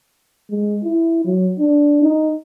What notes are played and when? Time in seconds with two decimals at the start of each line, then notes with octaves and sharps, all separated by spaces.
0.50 G#3
0.83 E4
1.25 F#3
1.59 D4
2.02 D#4